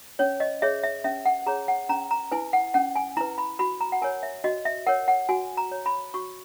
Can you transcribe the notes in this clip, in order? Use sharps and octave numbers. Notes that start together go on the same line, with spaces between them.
C#4 C#5
D#5
G#4 C#5 E5
E5
C#4 E5
F#5
G#4 C#5 A#5
F#5
C#4 A#5
A#5
E4 B4 G#5
F#5
C#4 F#5
G#5
E4 B4 A#5
B5
F#4 B5
A#5
F#5
A#4 C#5 G#5
E5
F#4 D#5
E5
A#4 C#5 F#5
F#5
F#4 G#5
A#5
C#5
B5
F#4 C#6